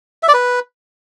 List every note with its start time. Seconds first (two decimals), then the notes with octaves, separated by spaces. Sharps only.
0.23 E5
0.28 D5
0.34 B4